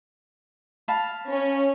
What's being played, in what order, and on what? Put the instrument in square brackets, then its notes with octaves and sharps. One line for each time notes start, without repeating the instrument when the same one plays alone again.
[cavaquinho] F5 A5 B5
[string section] C#4